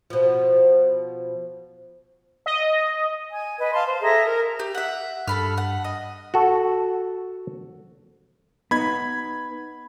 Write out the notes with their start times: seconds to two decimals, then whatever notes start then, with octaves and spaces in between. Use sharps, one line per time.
0.10 B2 F3
2.46 D#5
3.30 G#5
3.59 B4 D#5
3.73 F5 A5 C6
3.87 C5
4.01 G#4 A4 E5 A#5
4.25 A#4
4.59 G4
4.75 E5 F#5
5.28 G2 A4 B5 F6
5.58 F#5
5.84 D#5
6.34 F#4 A4
8.71 B3 D#4 B5 G#6